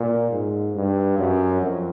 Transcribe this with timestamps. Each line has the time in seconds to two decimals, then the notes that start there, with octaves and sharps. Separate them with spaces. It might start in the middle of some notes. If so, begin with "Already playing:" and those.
Already playing: A#2
0.31 G#2
0.75 G2
1.18 F#2
1.61 F2